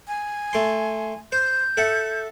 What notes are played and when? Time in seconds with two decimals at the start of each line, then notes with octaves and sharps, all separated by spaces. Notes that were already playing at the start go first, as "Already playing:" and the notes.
0.08 G#5
0.53 A3 C6
1.32 C5 G6
1.77 A4 E5 F#5